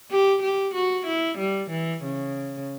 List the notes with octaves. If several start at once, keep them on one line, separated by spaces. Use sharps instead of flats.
G4
G4
F#4
E4
G3
E3
C#3